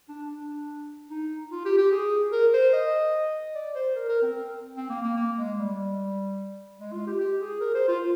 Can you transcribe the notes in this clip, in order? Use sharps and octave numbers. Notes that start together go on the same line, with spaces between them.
D4
D4
D#4
F4
G4
G4
G#4
A#4
C5
D#5
D5
C5
A#4
A#4
C4
C4
A#3
A#3
A#3
G#3
G3
G#3
F4
G4
G4
G#4
A#4
C5
F4